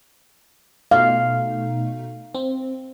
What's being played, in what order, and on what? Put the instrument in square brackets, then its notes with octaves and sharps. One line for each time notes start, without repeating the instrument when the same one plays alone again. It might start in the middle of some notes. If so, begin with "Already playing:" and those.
[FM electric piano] B2 A3 D#4 [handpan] F5
[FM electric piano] C4